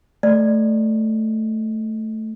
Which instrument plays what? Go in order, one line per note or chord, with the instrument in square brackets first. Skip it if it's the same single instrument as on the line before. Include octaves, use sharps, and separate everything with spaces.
[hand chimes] A3 [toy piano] D5